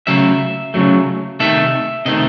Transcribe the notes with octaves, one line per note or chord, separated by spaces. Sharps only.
C#3 F#3 A3 E5
C#3 F#3 A3
C3 D#3 A3 E5
C3 D#3 A3 D#5